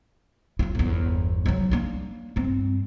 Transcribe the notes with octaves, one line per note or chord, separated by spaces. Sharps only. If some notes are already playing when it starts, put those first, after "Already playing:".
E4 F4
G1 E2
F3 F#3
A#3 D4
G2 C4